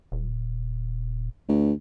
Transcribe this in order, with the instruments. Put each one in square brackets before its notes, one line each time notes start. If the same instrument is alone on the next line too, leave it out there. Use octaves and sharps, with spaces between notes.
[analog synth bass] D#1
[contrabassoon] D2